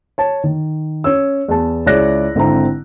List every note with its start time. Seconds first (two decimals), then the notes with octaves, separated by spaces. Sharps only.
0.18 C#5 A5
0.44 D#3
1.04 C#4 C#5 E6
1.48 E2 A5
1.86 C#2 E4 C#5 D5 F#6 A#6
2.35 G#1 D3 C4 E4 A#5